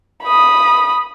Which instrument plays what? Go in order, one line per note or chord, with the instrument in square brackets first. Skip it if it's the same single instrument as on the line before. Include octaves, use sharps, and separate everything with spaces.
[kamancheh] B5 D#6